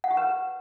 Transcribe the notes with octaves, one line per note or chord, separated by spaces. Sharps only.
F#5
G4
B4